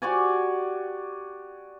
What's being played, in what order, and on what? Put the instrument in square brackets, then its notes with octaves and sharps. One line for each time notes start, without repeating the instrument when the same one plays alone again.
[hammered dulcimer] F#4 G4 D5 G#5